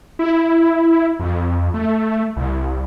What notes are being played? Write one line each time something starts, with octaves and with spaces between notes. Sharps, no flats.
E4
F2
A3
C2